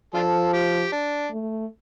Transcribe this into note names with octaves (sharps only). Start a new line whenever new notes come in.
F3 D4 F4 A4
G4
D4
A3